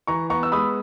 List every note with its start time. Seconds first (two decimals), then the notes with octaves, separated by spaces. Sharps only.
0.07 E3 A#5 C#6
0.30 B3 A#5 C#6
0.43 E6
0.52 G#3 B5 D#6